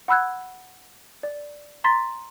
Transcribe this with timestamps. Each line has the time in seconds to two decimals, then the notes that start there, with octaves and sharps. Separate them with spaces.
0.08 F#5 B5 E6 F#6 G#6
1.23 D5
1.84 A#5 C6 A6 B6